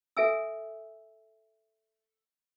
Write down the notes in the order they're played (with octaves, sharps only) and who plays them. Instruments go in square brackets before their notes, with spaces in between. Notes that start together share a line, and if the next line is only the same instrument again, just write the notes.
[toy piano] A4 E5 G#5 E6